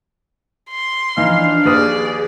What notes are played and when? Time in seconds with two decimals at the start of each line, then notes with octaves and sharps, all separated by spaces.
0.70 C6
1.17 E3 F3 D4 D#4 F5
1.65 D#2 G#4 B4 D5 D#6